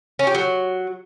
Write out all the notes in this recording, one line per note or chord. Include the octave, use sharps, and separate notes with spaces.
C#4
G4
F#3